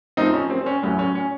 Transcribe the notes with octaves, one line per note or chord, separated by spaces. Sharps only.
A1 A2 F3 C4 D#4
C#4
C4
C4
C#4
A1 A2 F#3 C#4
C#4
C#4